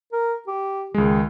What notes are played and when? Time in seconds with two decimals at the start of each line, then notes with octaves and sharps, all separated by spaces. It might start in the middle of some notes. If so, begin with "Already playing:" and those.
0.12 A#4
0.47 G4
0.94 C#2 D#3 G#3